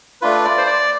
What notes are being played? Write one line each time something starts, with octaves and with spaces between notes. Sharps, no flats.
A3 D4 F4 B4
D5
C5
D5